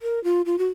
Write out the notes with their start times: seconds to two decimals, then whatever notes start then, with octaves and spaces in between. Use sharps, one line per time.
0.02 A#4
0.24 F4
0.46 F4
0.58 F#4